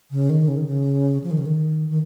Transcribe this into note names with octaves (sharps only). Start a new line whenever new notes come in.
C#3
D#3
C#3
D#3
C#3
F3
D#3
C#3
D#3
D#3